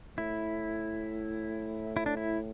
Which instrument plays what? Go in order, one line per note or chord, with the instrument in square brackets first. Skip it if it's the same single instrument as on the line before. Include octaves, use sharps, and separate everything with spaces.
[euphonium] A2 [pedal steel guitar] E4
[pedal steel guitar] E4
D4
E4